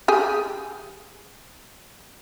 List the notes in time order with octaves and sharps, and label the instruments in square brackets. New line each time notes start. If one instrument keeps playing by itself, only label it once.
[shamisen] G4 G#4